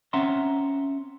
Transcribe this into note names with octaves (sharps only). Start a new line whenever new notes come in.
C4 C#4 E5 F#5 A#5 C6